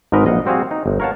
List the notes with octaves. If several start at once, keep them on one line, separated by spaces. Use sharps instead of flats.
G#1 G#2 D#4 A#4 B4 D#5
A#1 D#5 F5 F#5
G3 C4 F#4 G#4 F5
D#4
G1
A#4 C#5 F5 F#5 A5